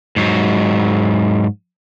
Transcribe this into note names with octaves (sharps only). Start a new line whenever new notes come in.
G#2 F#3